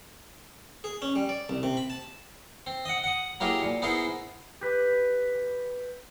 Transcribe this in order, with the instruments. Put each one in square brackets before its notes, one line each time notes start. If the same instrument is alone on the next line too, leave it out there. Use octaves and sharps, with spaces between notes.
[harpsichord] G#4
C#4
G3
D5
C2
C3
B5
A5
C4
D#5 F#5
F#5 D#6
F#3 A#3 E4 G4 G#4 A#4
A#2
B3 D#4 E4 G#4 A#4 C5
[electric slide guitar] G4 B4